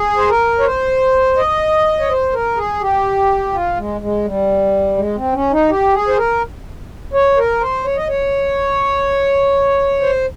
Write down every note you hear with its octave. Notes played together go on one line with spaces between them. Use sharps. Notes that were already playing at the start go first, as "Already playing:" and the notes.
Already playing: G#4
C5
A#4
C#5
C5
D#5
C#5
C5
A#4
G#4
G4
F4
G#3
G#3
G3
G#3
C4
C#4
D#4
G4
G#4
C5
A#4
C#5
A#4
C5
C#5
D#5
C#5
C5